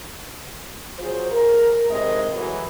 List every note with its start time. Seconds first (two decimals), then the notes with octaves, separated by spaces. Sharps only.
0.98 F#3 F4 G#4 C5
1.32 A#4
1.90 A2 C3 D#3 G#3 D#5
2.32 A2 E3 F#3